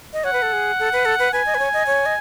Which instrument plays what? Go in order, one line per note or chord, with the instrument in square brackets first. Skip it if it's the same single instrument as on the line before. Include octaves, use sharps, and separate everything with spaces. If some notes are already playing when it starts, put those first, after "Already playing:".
[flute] D#5
[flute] C#5 [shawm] F#5
[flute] B4
A4
G#4
A4
B4
A4
B4
[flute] B4 [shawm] G#5
[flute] D#5
B4
C#5
D#5
C#5
D#5